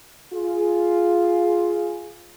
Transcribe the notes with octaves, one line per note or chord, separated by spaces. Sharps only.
F4 G#4